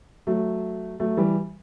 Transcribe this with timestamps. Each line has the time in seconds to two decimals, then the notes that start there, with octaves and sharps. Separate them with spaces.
0.27 F#3 A3
1.00 F#3 A3
1.17 E3 G3